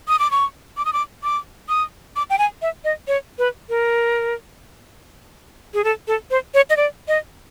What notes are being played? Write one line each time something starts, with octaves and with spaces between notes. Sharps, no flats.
D#6
D6
C#6
D6
D#6
D6
D6
D#6
D6
G5
G#5
E5
D#5
C#5
B4
A#4
G#4
A4
A4
C5
C#5
D#5
D5
D#5